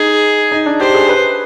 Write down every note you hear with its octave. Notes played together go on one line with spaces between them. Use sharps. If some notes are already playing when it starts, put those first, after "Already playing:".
Already playing: D#4 G#4
D#4
D4
G4 C5
G#4
B4